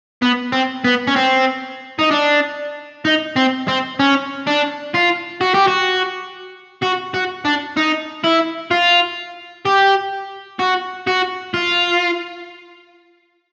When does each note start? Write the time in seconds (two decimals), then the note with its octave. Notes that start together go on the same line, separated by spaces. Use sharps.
0.22 B3
0.52 C4
0.84 B3
1.07 C#4
1.16 C4
1.99 D#4
2.11 D4
3.05 D#4
3.36 C4
3.68 C4
3.99 C#4
4.47 D4
4.94 F4
5.41 F#4
5.54 G4
5.68 F#4
6.83 F#4
7.14 F#4
7.45 D4
7.77 D#4
8.24 E4
8.71 F4
9.66 G4
10.59 F#4
11.07 F#4
11.54 F4